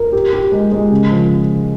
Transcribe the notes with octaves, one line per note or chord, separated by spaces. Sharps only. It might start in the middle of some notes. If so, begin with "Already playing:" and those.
Already playing: A#4
G4
G4
G#3
G#3
C#3
F3